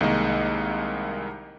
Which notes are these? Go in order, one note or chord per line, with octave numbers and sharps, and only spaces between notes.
C2 D#3 G#3 A#3 D#5